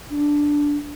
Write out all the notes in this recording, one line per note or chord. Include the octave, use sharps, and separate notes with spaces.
D4